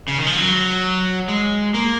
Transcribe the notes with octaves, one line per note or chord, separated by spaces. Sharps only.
C#3
D#3
F3
F#3
G#3
A#3